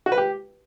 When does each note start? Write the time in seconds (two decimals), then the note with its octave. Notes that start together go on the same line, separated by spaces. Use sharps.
0.06 F#4
0.12 B4
0.18 G4